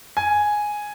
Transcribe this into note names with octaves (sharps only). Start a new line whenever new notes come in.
G#5